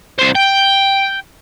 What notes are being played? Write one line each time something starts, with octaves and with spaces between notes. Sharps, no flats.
C2 C5
G5